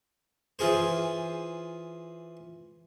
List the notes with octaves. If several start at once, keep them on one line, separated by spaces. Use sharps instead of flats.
E3 F4 G#4 C5